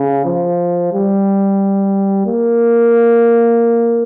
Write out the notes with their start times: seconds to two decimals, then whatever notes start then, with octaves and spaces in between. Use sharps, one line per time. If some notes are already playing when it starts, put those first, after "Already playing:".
Already playing: C#3
0.25 F3
0.92 G3
2.26 A#3